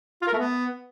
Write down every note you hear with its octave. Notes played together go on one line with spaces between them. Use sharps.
F4
A#4
A3
B3